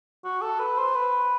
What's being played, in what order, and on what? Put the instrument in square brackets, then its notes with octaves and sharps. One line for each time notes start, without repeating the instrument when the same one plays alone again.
[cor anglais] F#4
A4
B4
C5
B4